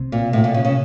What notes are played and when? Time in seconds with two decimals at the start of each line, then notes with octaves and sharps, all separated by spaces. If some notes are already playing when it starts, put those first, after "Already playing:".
Already playing: C3
0.12 A#2
0.33 A2
0.44 A#2
0.54 C#3
0.65 C#3